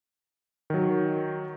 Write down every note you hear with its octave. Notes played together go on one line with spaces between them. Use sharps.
D#3 F#3